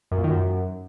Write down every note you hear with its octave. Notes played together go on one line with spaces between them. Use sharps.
F#2
A#2
D#3
F#2